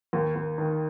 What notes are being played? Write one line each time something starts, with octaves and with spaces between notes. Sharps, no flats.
D#2
D#2
D#3